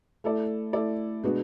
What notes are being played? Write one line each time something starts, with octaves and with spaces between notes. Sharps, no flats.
A3 E4 A4 D5
A3 E4 A4 D5
B2 G#3 B3 D4 F#4